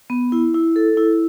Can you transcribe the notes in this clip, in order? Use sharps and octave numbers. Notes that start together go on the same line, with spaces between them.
B3
E4
E4
A4
E4